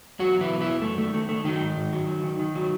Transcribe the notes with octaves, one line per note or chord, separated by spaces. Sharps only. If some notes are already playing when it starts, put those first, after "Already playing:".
E2 F#3 F#4
F#3
E3 E4
B2
E3 E4
E2
F#2 A3
D#3 A3
D#3 A3
D#3 A3
D#3 F#3 D#4
G#2
G#2
F#3
F#3
D#3
D#3
F#3